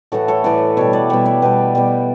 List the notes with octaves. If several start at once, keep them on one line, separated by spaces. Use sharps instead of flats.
A2 E3 A3 F#4 A4
A4 C#5
A2 E3 A3 B4 D5
B2 G3 C#5 E5
B4 D5
B2 G3 C#5 E5
B4 D5
B2 G3 G4 B4
B2 G3